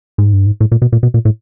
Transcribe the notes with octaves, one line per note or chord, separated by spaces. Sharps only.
G#2
G2
G#2
A2
A#2
B2
A#2
B2
A#2
A2